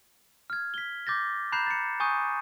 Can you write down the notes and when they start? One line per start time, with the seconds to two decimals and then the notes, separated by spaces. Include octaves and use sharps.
0.50 F6 G#6
0.74 B6 G7
1.07 D6 G6 A6 A#6
1.52 A#5 B5 F#6 G6 C7 E7
1.66 A6 C#7
2.00 G#5 C#6 D#6 G6 D#7